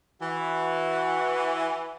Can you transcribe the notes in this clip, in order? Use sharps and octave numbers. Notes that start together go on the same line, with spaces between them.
E3 F#4